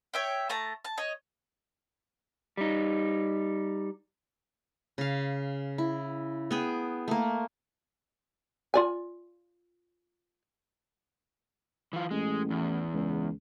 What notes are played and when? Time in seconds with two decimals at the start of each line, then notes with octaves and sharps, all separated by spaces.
0.14 C#5 E5 G5
0.49 A3 A5 A#5
0.85 A5
0.98 C#5 D#5
2.57 G3 D#4
4.98 C#3 F5
5.78 E4
6.51 B3 G#4 G5
7.08 A3 A#3
8.74 F4 D5 G#5
11.93 E3 F4
12.11 A1 G#3
12.50 E2
12.93 C#2